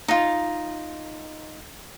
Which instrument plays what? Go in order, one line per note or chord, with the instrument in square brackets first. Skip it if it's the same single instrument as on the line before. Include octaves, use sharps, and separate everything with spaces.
[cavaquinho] D#4 F4